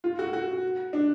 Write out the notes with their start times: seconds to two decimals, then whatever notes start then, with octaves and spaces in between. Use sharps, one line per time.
0.04 F4
0.19 F#4
0.33 F#4
0.93 D4